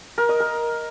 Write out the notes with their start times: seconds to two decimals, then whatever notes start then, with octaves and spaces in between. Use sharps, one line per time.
0.18 A#4
0.29 D#5
0.40 A#4